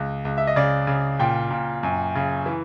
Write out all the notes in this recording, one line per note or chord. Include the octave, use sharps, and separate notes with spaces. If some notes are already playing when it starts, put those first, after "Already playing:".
Already playing: C#2
C#2
E5
D#5
C#3 D5
C#3
A#2 G5
A#2
F#2
C#3
E3